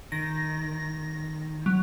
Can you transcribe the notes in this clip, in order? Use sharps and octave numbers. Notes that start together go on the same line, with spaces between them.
D#3 A#6
F#3